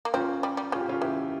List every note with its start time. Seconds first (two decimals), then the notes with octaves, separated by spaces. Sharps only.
0.05 A#3
0.14 C4 C#4 F4
0.43 G3
0.57 G3
0.72 C#3 F4
0.80 G4
0.89 C#4 F4
1.01 E3 E4 G4